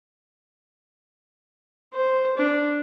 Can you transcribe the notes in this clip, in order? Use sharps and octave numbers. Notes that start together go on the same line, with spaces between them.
C5
D4